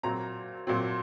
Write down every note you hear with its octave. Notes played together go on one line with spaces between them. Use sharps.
A#2 F#3 C4 A#5
A#2 F#3 C4